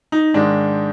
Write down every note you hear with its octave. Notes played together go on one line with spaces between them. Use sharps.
D#4
G#2 D#3 G#3 D4